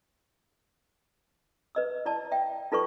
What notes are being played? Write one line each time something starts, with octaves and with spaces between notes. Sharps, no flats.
B4 D#5 E6
E4 D5 A5
E5 G5
D#4 F4 A4 B4 D5 C#6